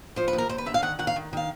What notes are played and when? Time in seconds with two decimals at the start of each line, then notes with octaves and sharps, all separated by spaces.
0.16 F3 C5
0.28 B4
0.33 D#2
0.38 A#4
0.49 D#2 C5
0.58 B4
0.66 D3 E5
0.74 F5
0.82 D#3 F#5
0.99 D#3 F#5
1.07 F5
1.16 D#3
1.33 D#3 F5